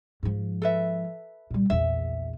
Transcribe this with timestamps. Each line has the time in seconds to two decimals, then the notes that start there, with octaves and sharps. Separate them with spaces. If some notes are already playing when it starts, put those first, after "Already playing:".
0.23 G#2 F3
0.62 A4 B4 E5
1.50 A#2 G3
1.70 A#1 E2 E5